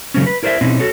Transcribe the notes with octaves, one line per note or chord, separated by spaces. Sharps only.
C#3 F#3 A3 C4 C#4
B4
E4 A#4 C5 D5 E5
B2 C4 C#4 D#4 E4
F#4 A4 C#5